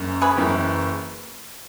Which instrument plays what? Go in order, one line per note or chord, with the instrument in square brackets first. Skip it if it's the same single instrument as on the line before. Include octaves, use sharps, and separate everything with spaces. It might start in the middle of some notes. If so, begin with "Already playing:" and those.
Already playing: [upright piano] F#1 F#2
[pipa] G#4 B4
[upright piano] F#1 F#2 E3